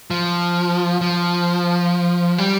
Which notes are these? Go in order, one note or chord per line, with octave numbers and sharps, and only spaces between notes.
F3
F3
G3